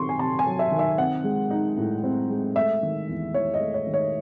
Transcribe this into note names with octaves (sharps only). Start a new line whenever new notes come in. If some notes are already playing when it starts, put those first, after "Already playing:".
Already playing: D#3 F#3 C4 C6 C#6
G#5
C3 A5
G#5
F#3
E5
D#3
E5
C4 F#5
G#3
D#4
A2
C4
G#3
A3 E5
D#3
E2
E2 C#5
D#5
A3
C#5
D#3
C#5